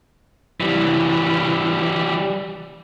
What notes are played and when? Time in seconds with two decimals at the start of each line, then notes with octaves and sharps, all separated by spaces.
0.60 E3 G3